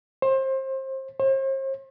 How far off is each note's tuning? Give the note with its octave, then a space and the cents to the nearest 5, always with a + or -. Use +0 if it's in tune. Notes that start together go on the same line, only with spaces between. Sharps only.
C5 +30
C5 +45